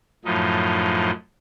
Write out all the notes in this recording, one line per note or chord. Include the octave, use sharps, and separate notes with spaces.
F#2 A2 F3 D#4